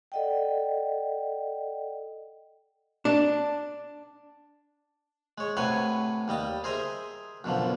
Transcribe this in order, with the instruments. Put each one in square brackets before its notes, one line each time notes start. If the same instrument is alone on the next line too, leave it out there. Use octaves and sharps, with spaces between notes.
[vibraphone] A4 D5 D#5 F#5 G5
[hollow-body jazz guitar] D4
[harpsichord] G#3 C#5
A2 C3 B4 C#5 F#5 G#5
D#2 G3 D#5 A5
G#4 A#4 C5 D#5 E5 A#5
F#2 B2 D3 F3